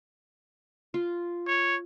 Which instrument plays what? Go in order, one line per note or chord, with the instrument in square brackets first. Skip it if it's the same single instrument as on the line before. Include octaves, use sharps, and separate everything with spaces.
[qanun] F4
[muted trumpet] C#5